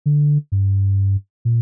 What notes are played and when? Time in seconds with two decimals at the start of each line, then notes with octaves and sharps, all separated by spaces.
0.06 D3
0.52 G2
1.45 A#2